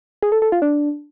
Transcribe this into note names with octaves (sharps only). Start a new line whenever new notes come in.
G#4
A4
A4
F4
D4